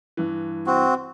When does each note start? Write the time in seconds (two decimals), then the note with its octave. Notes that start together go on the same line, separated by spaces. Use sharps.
0.17 G2 E3
0.67 C4 F#4